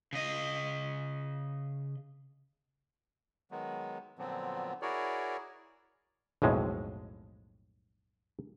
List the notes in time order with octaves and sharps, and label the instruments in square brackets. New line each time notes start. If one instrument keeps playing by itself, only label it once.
[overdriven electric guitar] C#3 D#5
[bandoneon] D#3 F#3 G#3 B3
A#2 D3 F3 F#3 B3 C4
E4 F#4 G#4 A#4 C#5 D5
[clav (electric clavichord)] B1 F2 A2 G#3